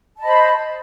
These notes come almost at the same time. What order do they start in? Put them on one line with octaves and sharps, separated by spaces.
A5 D#5 B5 C5